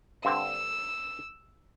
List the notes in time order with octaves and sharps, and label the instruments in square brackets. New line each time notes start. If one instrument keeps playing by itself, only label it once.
[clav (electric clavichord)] G2 D3 C4 [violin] E6